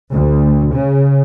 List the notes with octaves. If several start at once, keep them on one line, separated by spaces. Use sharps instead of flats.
D2
C#3